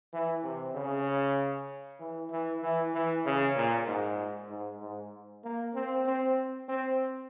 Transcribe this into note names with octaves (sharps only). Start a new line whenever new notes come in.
E3
C3
C#3
E3
E3
E3
E3
C#3
A#2
G#2
G#2
G#2
A#3
C4
C4
C4